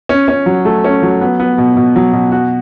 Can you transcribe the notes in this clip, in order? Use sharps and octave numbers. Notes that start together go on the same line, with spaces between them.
C#4
C#4
F#3
A3
C#4
F#3
B3
B3
B2
B2
F#3
B2
F#4